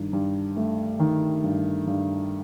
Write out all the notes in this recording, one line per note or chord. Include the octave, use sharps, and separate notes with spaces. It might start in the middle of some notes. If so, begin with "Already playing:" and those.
Already playing: G2 D#3
G2
A3
D#3
G2
G2